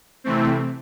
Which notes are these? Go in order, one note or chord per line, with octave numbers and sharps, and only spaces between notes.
C3 E3 A3 C4